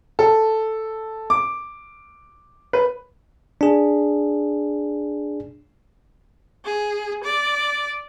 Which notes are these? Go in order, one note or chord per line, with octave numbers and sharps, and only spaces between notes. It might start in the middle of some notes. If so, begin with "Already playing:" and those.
A4
D6
B4
D4 G#4
G#4
D5